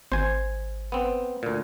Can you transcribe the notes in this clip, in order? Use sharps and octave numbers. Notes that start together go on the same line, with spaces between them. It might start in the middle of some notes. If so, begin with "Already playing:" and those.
G#1 C5 G#5
B3 C4
D2 A#2